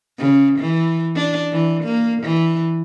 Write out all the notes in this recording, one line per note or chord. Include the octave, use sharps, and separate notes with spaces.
C#3
E3
D4
E3
A#3
E3